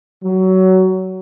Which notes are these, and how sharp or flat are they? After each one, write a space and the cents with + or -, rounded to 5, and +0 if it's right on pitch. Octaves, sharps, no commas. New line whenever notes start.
F#3 +20